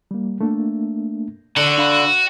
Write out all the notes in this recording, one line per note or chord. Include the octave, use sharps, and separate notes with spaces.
G3 A#3
A3 A#3 D4
D3 F#4
D4 F5 B5